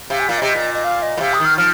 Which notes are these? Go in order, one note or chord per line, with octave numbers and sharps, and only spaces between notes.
C3 F5
G#5
A#2 F5
C3 D#5
A#2
D#5
F5
D#5
A#2
C3 F5
D#6
D#3
F6
F3 F6